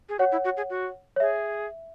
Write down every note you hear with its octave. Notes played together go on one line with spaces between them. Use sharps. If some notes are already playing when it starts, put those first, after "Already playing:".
G#4
F#4 C#5 F#5
E4
F#4
G#4
F#4
C#5
G#4 E5